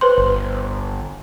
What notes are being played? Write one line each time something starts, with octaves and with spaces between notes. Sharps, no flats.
B4 C5 C6
G1